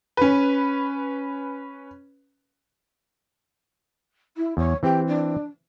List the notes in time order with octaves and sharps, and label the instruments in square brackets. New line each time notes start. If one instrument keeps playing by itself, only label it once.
[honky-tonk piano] C#4 B4
[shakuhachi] E4
[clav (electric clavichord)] E2 [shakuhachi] C#5
[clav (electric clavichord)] E3 C4 [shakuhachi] G4
[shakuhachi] D4